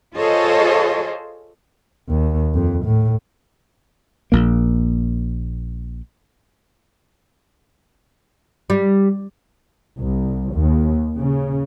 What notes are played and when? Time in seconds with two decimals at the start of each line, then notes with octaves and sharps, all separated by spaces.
0.14 F4 G#4 A4 C5 C#5 D#5
2.09 D#2
2.55 F2
2.85 A2
4.32 A#1 A#3
8.70 G3
9.98 C2
10.55 D#2
11.18 C#3